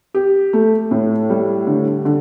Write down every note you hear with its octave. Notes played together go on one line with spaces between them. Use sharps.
G4
A3
A2
G3
D3
D3